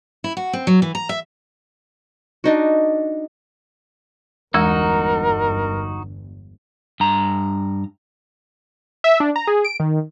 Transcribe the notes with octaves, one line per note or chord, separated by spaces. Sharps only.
E4
F#4
C4
F#3
E3
A#5
E5
D4 D#4 F#4
G1 E2 E3 G#3 D#4 F#4 A#4
G2 A#5
E5
D4
A#5
G#4
D7
D#3